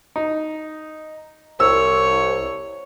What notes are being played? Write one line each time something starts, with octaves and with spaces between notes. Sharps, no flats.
D#4
C2 C#5 E6